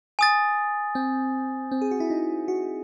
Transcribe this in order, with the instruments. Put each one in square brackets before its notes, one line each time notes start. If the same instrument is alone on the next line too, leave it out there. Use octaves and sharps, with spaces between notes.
[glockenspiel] G#5 D#6 A6
[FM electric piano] C4
C4
G#4
F#4
E4
D#4
F#4